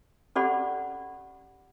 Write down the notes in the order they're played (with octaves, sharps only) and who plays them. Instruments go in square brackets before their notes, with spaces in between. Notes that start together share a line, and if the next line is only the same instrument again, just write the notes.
[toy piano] C#4 G4 A4 D5 F#5 B5